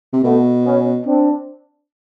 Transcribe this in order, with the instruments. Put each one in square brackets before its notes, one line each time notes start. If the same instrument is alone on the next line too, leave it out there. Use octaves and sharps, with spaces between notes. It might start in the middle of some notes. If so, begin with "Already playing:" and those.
[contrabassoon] C3
[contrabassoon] B2 [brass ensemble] A3 B3
[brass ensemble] B3 C#4
C4 D4